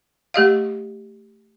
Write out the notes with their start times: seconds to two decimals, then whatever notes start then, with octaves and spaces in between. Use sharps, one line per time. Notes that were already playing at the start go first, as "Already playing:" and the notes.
0.34 A3 G4 D#5 F5